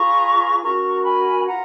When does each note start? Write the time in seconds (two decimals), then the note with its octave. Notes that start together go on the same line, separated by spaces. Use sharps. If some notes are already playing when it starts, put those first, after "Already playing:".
Already playing: F4 G#4 B4 A#5 C#6
0.61 C#4 F#4 A#4 A#5 C#6
1.03 G#5 B5
1.45 F4 B4 F#5 A#5